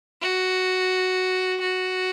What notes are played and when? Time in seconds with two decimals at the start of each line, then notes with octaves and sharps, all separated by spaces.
0.22 F#4
1.60 F#4